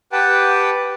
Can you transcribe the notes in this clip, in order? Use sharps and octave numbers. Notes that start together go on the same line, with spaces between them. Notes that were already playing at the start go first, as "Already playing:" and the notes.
G4 B4 F#5 G5 A5